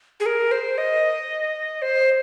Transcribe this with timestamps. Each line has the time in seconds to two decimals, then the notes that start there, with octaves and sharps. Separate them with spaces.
0.20 G#4
0.26 A#4
0.52 C5
0.78 D#5
1.82 C5